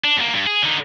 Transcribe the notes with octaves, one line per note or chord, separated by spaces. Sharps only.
D4
E2 A#3
G2
G#4
D3 D#4